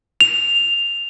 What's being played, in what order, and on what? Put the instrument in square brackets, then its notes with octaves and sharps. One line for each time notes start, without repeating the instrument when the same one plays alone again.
[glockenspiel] F7